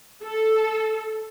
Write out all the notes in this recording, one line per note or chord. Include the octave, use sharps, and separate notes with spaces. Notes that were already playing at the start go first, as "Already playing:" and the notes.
A4